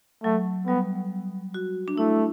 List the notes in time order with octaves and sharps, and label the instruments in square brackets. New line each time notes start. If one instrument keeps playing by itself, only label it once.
[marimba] F#3 [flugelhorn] A3
[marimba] G3 [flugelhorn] B3
[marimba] F#4
D4
[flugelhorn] A3 [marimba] E4